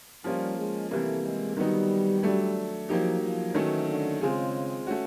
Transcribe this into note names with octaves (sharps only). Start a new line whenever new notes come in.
F3 G3 A#3 C#4 F4
G#3
C3 E3 G3 A3 A#3
G#3
D#3 F#3 G3 B3 D#4
F#3 A3 D4
F3 F#3 A#3 D#4 G4
F3
D#3 E3 F#3 A3 C#4
D3
C#3 G#3 C4 F4 G#4
A3 C#4 F#4